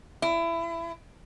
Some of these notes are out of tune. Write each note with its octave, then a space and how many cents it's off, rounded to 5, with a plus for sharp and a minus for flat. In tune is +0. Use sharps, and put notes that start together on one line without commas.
E4 +25